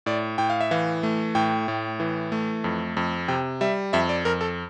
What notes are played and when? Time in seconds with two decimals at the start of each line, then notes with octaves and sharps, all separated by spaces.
0.06 A2 D5
0.38 A2 G5
0.50 F5
0.61 E5
0.71 E3 F5
1.03 A3
1.35 A2 G5
1.68 A2
2.00 E3
2.32 A3
2.64 F2
2.97 F2
3.28 C3 G5
3.61 G3 E5
3.93 F2 E5
4.09 D5
4.25 F2 A#4
4.41 A4